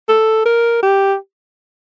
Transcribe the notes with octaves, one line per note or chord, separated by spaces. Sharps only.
A4
A#4
G4